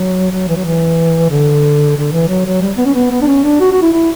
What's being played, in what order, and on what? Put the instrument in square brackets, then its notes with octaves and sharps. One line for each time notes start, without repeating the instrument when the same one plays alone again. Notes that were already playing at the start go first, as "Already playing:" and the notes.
Already playing: [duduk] F#3
F#3
E3
F#3
E3
D3
D3
E3
F#3
F#3
G3
B3
C#4
B3
B3
D4
C#4
D4
F#4
F#4
E4
E4